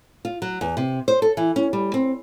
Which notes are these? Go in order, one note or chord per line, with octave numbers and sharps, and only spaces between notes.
F4
F#3
E2
C3
C5
A4
E3
C#4
G3
C4